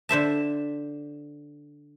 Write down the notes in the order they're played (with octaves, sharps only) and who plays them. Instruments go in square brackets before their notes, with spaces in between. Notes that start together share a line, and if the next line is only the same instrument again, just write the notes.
[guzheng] D3 C5 E5 A5